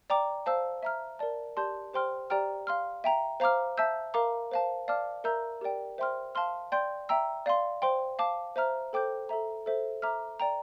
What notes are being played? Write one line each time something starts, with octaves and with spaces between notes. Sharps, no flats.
D5 G5 A#5 D6
C5 F5 A5 E6
E5 A#5 F6
A#4 D5 A5
G4 D5 A5 C6 G6
G4 C5 G5 C6 F6
G4 D5 G5 A#5 F6
F5 C6 F6
E5 G5 A#5
C5 F5 A#5 D6 F6
E5 A5 E6 G6
A#4 F5 A#5 D6
C5 F5 A5
D5 F5 A5 D6 F6
A#4 E5 A#5 E6 G6
G4 A#4 D5 G5
C5 E5 G5 C6 F6
F5 A5 C6 F6
D5 G5 C6 G6
E5 G5 A#5 E6
D5 F5 C6
C5 G5 C6
F5 A5 D6
C5 E5 A#5 F6
A4 C5 G5 D6 G6
A4 E5 A#5
A4 C5 E5
E5 A#5 D6 F6
D5 G5 A#5